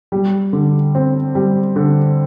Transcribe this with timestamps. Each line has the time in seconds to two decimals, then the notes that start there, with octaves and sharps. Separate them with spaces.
0.12 G3
0.53 D3
0.95 C4
1.35 G3
1.76 D3